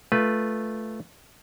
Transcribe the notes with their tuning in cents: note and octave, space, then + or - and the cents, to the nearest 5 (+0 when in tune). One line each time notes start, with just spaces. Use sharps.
A3 -5 F4 -10 B4 -10